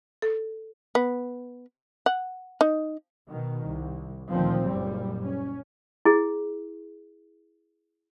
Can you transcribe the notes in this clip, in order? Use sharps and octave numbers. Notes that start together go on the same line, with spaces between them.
A4
B3
F#5
D#4
B2 D#3
C2
D2 A#2 D#3 F3 C4
F#1 F#2 A#2 G3
C#4
E4 G#4